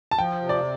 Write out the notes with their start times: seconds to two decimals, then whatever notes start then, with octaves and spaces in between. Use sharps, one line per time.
0.11 A5
0.18 F3 G5
0.41 C3
0.49 D5